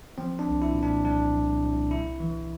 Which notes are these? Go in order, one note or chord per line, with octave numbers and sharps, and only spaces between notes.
F3 C4
D4
C2
E4
A#2
D4
C2 D4
C2
C2
C3 E4
E3